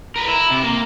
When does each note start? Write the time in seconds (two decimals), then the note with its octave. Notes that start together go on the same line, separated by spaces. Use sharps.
0.16 A#4 B4
0.28 E4
0.51 C3
0.64 A#3